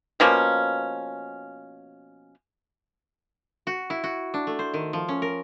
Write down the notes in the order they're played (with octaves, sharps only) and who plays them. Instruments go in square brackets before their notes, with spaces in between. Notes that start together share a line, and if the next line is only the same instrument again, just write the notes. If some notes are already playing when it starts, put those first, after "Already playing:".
[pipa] B2 F3 A#3 C#4
[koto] F#4
E4
F#4
D4
A3
C5
D#3
F3
C#4
A#4